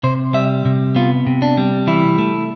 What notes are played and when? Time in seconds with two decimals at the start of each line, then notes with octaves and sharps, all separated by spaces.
0.03 C3 C5
0.33 G3 E5
0.65 C3
0.96 B3 F4
1.27 C3
1.42 D4
1.57 G3
1.87 E3 E4
2.18 A3